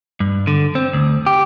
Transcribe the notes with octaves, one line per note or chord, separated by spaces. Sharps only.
G2
D3
C4
D2
G4